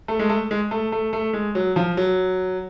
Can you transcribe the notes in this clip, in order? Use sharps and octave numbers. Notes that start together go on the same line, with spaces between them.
A3
G#3
A3
G#3
A3
A3
A3
G#3
F#3
F3
F#3